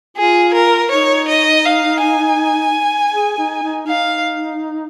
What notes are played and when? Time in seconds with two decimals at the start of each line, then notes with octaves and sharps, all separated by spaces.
0.17 F4 G#4
0.54 A#4
0.91 D#4 C#5
1.28 D#5
1.65 F5
2.02 G#5
3.13 G#4
3.38 D#4
3.63 D#4
3.87 D#4 F5